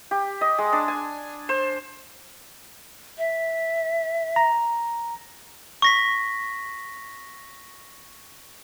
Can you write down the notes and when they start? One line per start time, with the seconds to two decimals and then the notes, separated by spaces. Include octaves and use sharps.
0.11 G4
0.41 D#5
0.58 G#3
0.73 D4
0.88 G#5
1.49 C5
3.18 E5
4.36 A#5
5.82 C#6 A#6 B6